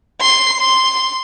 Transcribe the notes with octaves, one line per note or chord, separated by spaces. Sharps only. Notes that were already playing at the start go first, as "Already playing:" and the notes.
C6 C7
C6